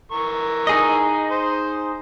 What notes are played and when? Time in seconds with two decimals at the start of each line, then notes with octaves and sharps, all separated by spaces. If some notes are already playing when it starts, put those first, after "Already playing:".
0.12 E3 A#4 C#6
0.67 D#4 G#4 D#5
1.31 C5